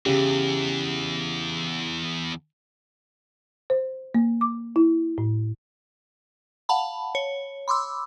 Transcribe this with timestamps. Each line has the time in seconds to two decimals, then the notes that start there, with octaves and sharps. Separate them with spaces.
0.06 E2 C#3 E3 G4
3.70 C5
4.15 A#3
4.41 D6
4.76 E4
5.18 A2
6.69 F5 F#5 A5 B5
7.15 C#5
7.68 B5 C6 D6 E6